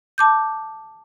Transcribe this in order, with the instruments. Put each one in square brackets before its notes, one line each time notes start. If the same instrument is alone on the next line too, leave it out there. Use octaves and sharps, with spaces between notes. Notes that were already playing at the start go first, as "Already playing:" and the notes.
[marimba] A5 D6 G6